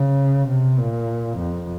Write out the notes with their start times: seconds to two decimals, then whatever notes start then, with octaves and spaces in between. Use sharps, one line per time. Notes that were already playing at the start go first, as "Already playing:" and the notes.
Already playing: C#3
0.49 C3
0.78 A#2
1.38 F2